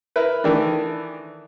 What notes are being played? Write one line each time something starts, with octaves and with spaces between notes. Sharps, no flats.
E4 A#4 B4
D#3 E3 A3 D4